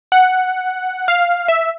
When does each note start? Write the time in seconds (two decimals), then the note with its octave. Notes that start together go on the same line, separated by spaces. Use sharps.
0.12 F#5
1.08 F5
1.48 E5